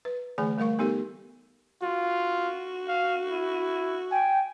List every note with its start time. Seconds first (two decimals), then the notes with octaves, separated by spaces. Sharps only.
0.05 B4
0.38 D3 E3 A3 G#4 G#5
0.58 G3 A3 A#4 F5 C#6
0.79 B3 D#4 G4 A4 A#4
1.82 F4 F#4
2.88 F5
3.30 E4
4.12 G5 G#5